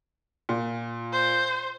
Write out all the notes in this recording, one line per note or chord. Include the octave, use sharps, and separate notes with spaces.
A#2
C5